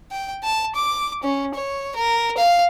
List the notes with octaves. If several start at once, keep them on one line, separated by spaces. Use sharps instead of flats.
G5
A5
D6
C#4
C#5
A#4
F5